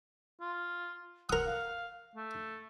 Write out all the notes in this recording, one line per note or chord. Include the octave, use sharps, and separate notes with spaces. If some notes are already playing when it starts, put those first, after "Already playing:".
F4
A#4 F#5 D#6
F5
A3